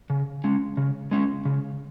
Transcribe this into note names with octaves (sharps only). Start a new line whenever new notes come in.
C#3
G#3 C#4
C#3
G#3 C#4
C#3